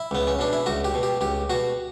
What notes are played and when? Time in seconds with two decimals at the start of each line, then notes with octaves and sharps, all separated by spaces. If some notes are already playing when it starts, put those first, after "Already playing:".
Already playing: E4
0.11 C#2 B3
0.27 C#4
0.39 B2 D4
0.53 E4
0.66 C#2 F#4
0.84 G4
0.94 B2
1.03 G4
1.21 C#2 G4
1.50 B2 F#4